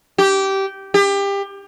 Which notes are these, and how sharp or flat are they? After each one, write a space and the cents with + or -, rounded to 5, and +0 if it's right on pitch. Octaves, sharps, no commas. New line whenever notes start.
G4 -15
G4 +25